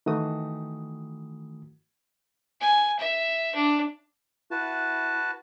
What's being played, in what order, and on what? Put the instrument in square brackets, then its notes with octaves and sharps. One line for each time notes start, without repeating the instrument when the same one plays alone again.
[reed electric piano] D#3 E3 A3 F#4 D#6
[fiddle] G#5
E5
D4
[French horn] E4 [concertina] F#4 B4 A5